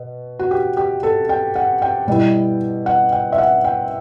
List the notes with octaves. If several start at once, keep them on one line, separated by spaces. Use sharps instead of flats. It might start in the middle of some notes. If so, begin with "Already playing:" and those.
Already playing: B2
F#4
G4
G4
A4
G5
F#5
G5
B2 G3 B3 E4
F#5
G5
E5
F#5
G5